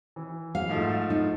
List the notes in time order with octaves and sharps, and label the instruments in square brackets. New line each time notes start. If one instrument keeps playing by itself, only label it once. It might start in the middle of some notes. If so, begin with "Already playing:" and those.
[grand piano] E3
[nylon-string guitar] F5
[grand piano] G#2 F3 A3
[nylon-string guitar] D#4